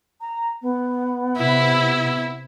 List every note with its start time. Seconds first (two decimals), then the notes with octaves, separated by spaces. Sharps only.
0.21 A#5
0.62 B3
1.37 C3 E4